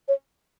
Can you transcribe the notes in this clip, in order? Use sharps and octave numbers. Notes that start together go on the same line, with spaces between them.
C#5